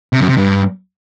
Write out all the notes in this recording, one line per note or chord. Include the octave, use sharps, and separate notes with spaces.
C3
F#2
C3
G2